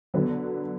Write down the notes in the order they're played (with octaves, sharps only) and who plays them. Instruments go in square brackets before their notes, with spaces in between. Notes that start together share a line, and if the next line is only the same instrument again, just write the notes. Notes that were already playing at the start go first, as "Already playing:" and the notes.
[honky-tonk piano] D3 F#3 B3